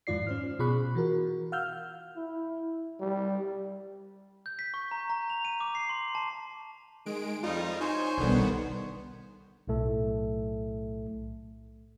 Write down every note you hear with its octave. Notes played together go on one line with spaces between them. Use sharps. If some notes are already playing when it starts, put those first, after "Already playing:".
F2 G#2 D#3 F4 D5 C7
C#4 C5 F6
B2 F4 G#4 B5 C#6 F#6
E3 F#4 A#4
F5 F#5 E6 F6 G6
E4
G3
G6
B6
C#6
A#5
A#5
F7
D#7
D6
C7
C6
A5
D#3 G#3 D7
F2 G3 D#4 F4
D#4 C5 C#5 G#5
B1 D3 D#3 G3 B3
B1 A2 A3 A4